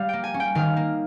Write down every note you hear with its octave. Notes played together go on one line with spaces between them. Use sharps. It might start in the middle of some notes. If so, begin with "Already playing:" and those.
Already playing: G3 F5
A#3 G5
G#5
C#4
G5
D#3 F5
A#3